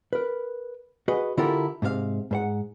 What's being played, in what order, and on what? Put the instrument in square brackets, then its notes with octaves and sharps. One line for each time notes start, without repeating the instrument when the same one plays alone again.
[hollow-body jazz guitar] A#4 B4
F#4 G#4 B4 D#5
D3 E4 F4 G4 A4 A#4
G#2 C3 G#4 F5
G#2 C5 F#5